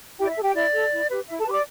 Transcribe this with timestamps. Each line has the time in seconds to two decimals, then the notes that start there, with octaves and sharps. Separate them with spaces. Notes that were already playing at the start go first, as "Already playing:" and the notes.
0.19 E4 G4 G5
0.26 D5
0.31 E5
0.37 A4
0.43 G4 G5
0.55 E4 D5
0.73 A4
0.91 E4
1.10 G4 B4
1.27 E4 E5
1.39 A4 A5
1.46 G4 B4 B5
1.52 D5 D6